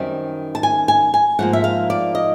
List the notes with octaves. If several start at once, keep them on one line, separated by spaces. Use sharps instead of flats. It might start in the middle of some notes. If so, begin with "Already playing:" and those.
Already playing: F#2 D#3 G3 C4
A5
G#5
G#5
G#5
G#2 F3 A#3 F#5
E5
F5
D5
D#5